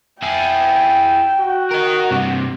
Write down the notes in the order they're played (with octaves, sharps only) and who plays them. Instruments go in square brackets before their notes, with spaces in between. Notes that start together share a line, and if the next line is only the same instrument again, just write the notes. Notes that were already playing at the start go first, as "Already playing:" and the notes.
[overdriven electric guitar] E4 G#4 [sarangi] G5
[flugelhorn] F#4
[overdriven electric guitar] A#4 D#5
G2 C3